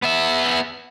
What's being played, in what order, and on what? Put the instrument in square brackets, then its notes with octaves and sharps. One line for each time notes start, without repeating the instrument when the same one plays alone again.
[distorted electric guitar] B3 E5